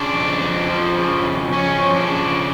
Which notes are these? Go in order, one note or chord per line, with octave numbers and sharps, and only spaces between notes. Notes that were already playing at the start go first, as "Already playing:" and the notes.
Already playing: C#3 D4
F2
F2
F3
C#3
F2
F2 C#4
F3
D4
C#3